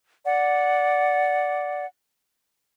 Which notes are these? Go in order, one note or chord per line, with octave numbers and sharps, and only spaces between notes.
D5 F#5